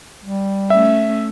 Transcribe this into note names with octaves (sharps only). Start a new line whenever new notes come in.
G3
A3 C#4 E5